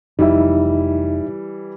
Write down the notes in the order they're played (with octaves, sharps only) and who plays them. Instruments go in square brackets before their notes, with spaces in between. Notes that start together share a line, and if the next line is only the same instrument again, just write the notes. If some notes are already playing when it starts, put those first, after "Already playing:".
[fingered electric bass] F1 [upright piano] E3 G3 [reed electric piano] D#4 E5